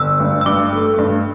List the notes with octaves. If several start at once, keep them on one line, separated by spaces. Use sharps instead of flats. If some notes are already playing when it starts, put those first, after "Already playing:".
Already playing: G1 E6
G2
E6
G2 D6
A3
G2